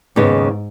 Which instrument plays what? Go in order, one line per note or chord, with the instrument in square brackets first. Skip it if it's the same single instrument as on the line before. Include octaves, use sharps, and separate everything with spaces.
[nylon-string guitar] D#2 C#3 B3 [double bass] G#2